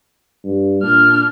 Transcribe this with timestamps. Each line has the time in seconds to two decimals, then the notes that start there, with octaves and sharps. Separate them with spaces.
0.44 G2
0.83 A#2 D4 F6